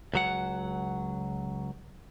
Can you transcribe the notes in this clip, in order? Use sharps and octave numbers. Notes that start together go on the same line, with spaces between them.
C#2 F#3 F#5